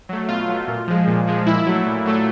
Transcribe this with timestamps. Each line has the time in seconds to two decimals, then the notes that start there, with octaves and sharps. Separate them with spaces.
0.09 F#3 A3
0.29 B2 F4
0.48 F#3 A3
0.68 A#2
0.88 F3 G#3
1.07 A#2
1.27 F3 G#3
1.46 A#2 E4
1.66 F#3 A3
1.86 A#2
2.06 F#3 A3